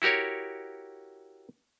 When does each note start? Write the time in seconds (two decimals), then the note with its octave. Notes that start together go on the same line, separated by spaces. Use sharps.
0.02 E4 F#4 G4 A#4 C#5